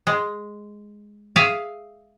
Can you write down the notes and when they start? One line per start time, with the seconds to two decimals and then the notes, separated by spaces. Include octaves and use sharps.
0.07 G#3
1.36 G#4 E5 F5